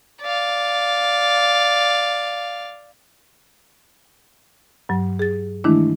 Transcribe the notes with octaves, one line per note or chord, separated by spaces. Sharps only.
D5 F5
G2 F#3
G#4 A6
D#3 E3 G#3 A3 D4 E4